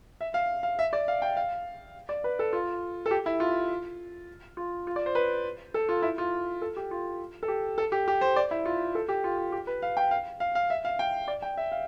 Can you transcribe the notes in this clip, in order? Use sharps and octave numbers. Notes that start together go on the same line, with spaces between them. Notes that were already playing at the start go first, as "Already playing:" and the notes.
E5
F5
F5
E5
D5
F5
G5
F5
D5
B4
A4
F4
A4
G4
E4
F4
F4
F4
D5
C5
B4
A4
F4
E4
F4
A4
G4
F4
A4
G4
A4
G4
G4
C5
D5
E4
F4
A4
G4
F4
F4
G4
B4
F5
G5
F5
F5
F5
E5
F5
G5
D5
G5
E5
F5